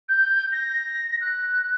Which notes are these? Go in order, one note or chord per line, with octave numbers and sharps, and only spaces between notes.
G6
A#6
F#6